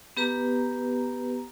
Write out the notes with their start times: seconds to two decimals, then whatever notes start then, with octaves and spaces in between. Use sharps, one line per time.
0.17 B3 G4 B4 A#5